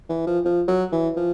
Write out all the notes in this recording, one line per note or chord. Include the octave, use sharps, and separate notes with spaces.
E3
F3
F3
F#3
E3
F3